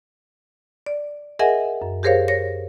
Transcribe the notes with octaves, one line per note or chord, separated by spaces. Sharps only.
D5
G#4 A#4 D#5 E5 F#5 G#5
F#2
G4 G#4 A#4 C5 C#5 F5
C#5 A#6